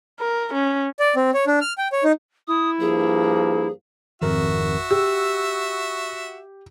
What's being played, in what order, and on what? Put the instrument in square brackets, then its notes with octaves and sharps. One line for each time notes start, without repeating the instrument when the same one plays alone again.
[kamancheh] A#4
C#4
[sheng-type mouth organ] D5
C4
C#5
D4
F6
G5
C#5
D#4
[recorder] E4 [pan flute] D#6
[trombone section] G2 F3 A#3 [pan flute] G#4
[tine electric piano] G#1 F2 A#4 [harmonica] F#4 E5
[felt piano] G4 [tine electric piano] E6